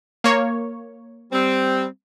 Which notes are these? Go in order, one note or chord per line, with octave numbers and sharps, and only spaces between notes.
A#3 C#5
G3 C4